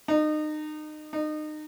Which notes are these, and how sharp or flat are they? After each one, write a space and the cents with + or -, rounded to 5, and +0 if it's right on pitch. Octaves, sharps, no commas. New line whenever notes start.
D#4 -30
D#4 -30